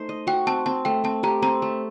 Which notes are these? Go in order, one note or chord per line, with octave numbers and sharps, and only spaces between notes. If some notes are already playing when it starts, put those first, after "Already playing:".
Already playing: A3 D#4 C5
D#5
F#4 G5
C4 A5
C4 A5
A3 G5
C4 A5
G4 A#5
C4 A#5
A3